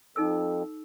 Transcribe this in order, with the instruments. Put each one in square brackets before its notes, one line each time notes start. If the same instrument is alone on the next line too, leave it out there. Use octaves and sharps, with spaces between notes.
[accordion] F2 [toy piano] D#4 A4 E6